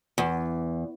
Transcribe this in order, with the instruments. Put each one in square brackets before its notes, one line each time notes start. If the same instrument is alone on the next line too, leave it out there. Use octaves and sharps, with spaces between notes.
[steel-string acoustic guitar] E2